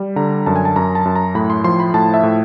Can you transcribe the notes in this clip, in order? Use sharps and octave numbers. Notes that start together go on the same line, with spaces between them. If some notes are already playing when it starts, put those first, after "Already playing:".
Already playing: G3
D3 A#5
F#2 A5
G#5
A5
F#2 A#5
A5
F#2
A#5
A2 B5
C6
F3 C6
B5
A2 A5
E5
A2